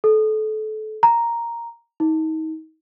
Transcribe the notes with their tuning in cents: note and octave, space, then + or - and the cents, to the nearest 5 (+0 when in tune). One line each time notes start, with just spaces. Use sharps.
A4 -25
A#5 +0
D#4 +30